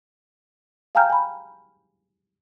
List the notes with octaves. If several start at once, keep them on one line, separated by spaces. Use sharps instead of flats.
F5 G5 G#5 A#5 F6 G6
G#5 B5